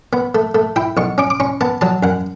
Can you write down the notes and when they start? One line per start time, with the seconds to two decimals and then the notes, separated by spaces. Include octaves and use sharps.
0.13 B3
0.35 A3
0.55 A3
0.76 E4 G5
0.97 B1 C#6
1.18 C#4 D6
1.30 D6
1.40 C#4 C#6
1.61 B3 A5
1.81 F#3 A5
2.03 F#2 F#5